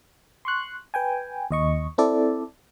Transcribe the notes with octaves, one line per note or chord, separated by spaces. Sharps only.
C6 C#6 F#6
B4 G5 G#5
D#2 D#5 C#6
C4 E4 A4 D5